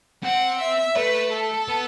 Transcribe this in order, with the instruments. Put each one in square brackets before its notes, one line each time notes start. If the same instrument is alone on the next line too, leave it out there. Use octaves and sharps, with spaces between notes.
[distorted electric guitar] C4 [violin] F#5
[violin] E5
[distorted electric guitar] A3 [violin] B4
[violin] A4
[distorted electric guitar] B3